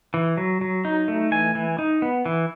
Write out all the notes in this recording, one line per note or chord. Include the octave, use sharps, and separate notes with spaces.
E3
F#3
F#3
D#4
A3
E3 G#5
E3
D#4
B3
E3